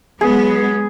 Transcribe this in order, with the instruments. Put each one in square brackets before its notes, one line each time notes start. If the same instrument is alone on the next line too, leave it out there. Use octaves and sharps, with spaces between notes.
[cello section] F#3 G#3 B3 [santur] G#4